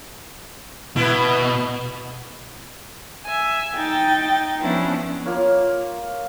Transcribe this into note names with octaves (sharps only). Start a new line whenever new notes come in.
B2 E4 B4
E5 G#5
D#4 G5 A6
F3 B3 C#4 D4 E4
A#3 F4 A#4 C#5